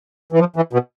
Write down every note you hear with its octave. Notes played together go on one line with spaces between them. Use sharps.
E3
F3
E3
B2